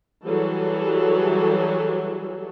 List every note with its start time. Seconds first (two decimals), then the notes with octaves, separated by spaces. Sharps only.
0.25 E3 F#3 G3 F#4 G#4 A4